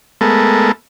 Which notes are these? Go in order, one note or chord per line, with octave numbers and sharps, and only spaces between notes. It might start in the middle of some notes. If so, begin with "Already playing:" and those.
G#3 A3 B3 A4 A#4